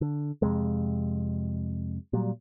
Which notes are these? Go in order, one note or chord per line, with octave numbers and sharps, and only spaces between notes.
D3
F2 C3 G#3
A#2 F#3 G3